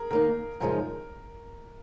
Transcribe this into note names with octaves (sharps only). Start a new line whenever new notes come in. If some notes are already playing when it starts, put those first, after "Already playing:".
Already playing: G#4 A#4
D#3 A#3 D#4 A#4
F#2 C#3 F3 G#3 D#4 A#4